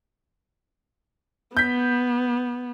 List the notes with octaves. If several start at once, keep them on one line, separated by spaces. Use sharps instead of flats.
B3 G6 B6